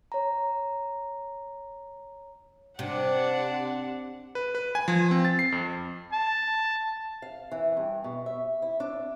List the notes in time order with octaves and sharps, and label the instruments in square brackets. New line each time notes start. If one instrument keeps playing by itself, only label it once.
[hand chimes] C#5 A#5
[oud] C3 [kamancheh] D4 F#5
[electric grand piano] B4
B4
G#5
F3
C4
A6
C7
F2
[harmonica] A5
[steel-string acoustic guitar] F5
E3
G2
B2
E5
E4
D4